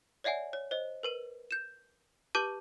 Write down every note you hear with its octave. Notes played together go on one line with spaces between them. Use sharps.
C#5 D5 E5 F#5 G#5
C#5
C5 D#5
A#4 B4 D#7
G6 E7
G4 B4 A5 D6 G6 D#7